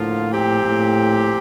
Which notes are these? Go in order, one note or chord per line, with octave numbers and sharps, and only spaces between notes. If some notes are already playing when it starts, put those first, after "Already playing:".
Already playing: A2 D3 F3 A#3 F4
A#2 F3 C4 G4
A2